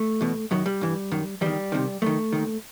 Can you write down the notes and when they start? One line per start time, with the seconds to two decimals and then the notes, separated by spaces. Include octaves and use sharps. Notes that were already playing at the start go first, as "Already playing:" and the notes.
Already playing: A3
0.21 E2 B2
0.51 F#2 D#3 F#3
0.66 G3
0.81 G2 E3
1.11 F#2 D#3
1.41 E2 D#3 G3
1.72 C2 C3 D#3
2.02 F#2 D#3 A3
2.32 D#2 D#3